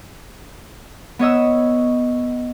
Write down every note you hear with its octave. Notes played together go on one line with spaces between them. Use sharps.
B3 C#5 D#5 E6